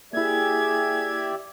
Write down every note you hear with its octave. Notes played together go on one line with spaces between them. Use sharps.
A#3 E4 G4 G#4 D5 E5 G#6